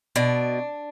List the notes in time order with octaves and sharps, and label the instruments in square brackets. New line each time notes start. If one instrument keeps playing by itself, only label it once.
[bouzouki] B2 D4